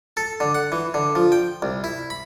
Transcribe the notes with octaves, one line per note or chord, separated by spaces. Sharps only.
A4
D3
F#5
E3
D3
F3
G5
C2
E4
B5